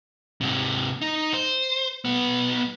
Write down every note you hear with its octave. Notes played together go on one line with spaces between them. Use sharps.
G#2 C3
D#4
C5
B1 B3